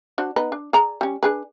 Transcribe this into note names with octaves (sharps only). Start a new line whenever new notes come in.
D4 F#4 C5
B3 D#4 B4
D4
G#4 D5 A#5
G3 C#4
D4 G#4 B4